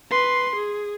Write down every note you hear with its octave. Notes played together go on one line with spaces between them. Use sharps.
B4 C6
G#4